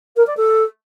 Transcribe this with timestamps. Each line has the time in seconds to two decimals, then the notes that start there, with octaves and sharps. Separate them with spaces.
0.16 A#4
0.26 D5
0.36 A4